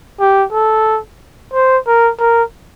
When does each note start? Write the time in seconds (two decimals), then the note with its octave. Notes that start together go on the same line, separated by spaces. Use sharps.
0.20 G4
0.53 A4
1.54 C5
1.87 A#4
2.19 A#4